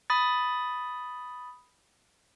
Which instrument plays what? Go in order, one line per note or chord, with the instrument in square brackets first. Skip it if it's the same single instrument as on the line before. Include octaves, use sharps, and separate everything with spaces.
[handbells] B5 D#6 A6